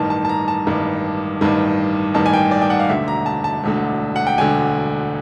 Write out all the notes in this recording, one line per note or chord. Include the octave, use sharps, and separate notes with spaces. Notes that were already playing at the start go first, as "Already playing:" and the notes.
Already playing: A1 G2 D#3 A5
A5
A5
A#5
A5
A1 G2 D#3
A1 G2 D#3
A1 G2 D#3 A5
G#5
G5
D5
G5
F#5
F5
E1 D2 D3 E5
A#5
A5
A5
E1 D2 D3
F#5
G5
E1 D2 D3 G#5